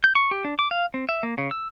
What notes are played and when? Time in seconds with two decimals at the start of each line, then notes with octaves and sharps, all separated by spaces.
0.04 G6
0.15 C#6
0.31 G4
0.44 D4
0.59 D6
0.71 F5
0.94 C4
1.09 E5
1.23 A#3
1.38 C#3
1.51 E6